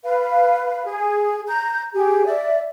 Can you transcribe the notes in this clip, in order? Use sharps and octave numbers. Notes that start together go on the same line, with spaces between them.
B4 F5
G#4
A#5 G6
G4 G#4
D5 E5